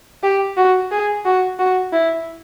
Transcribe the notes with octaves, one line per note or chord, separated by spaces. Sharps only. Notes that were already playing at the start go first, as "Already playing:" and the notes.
G4
F#4
G#4
F#4
F#4
E4